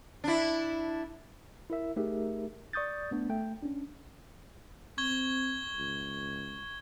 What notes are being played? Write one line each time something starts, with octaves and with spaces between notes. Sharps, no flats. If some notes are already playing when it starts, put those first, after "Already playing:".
D4 E4
E4 A#4 E5
A3 D#4 G4 G#4 A#4 E5
D5 C#6 D#6 G6 A6
A3 B3 D4
A3 G5
C#4 D4
C4 C#6 G#6 G7
C#2